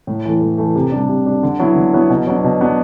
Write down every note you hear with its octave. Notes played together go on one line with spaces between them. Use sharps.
A2
E3 A3
A2
E3 A3
C3
G3 D4
C3
G3 D4
D3
F#3 B3 E4
D3
F#3 B3 E4
B2
F#3 B3 D4
B2
F#3 B3 D4